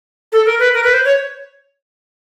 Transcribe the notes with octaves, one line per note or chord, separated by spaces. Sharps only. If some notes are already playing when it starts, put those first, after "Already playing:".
A4
A#4
B4
A#4
B4
C5
C#5